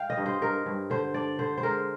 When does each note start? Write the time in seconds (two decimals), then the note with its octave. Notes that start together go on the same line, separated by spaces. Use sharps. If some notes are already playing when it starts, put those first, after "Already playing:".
Already playing: F5 G5
0.10 D#5
0.17 G2
0.26 C5
0.41 G2 A#4
0.66 G2
0.90 D3 C5
1.14 D4 D5
1.39 D3 C5
1.58 C5
1.63 G#3 A#4